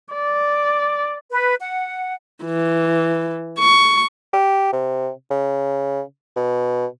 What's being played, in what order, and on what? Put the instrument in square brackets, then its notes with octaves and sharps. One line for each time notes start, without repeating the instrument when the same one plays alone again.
[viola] D5
[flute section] B4
F#5
[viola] E3
C#6
[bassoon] G4
C3
C#3
B2